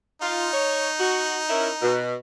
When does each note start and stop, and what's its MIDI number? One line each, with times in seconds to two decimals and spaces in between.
0.22 1.97 63
0.22 0.48 65
0.53 0.89 73
1.00 1.37 66
1.49 1.69 61
1.49 1.69 64
1.49 1.69 70
1.82 2.14 47